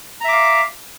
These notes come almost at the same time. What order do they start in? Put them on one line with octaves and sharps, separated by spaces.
A#5 E5 D6 F5